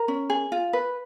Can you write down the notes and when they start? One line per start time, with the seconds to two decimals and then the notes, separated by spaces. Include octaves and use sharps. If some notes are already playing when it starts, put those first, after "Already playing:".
Already playing: A#4 A#5
0.08 C#4
0.30 G#4
0.52 F4
0.73 B4